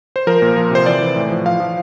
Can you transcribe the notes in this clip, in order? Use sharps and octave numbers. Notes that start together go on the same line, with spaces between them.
C5
F3 A#4
A#2
F3
C3 C5
E3 D5
E3
A2
F3
F3 F5
F3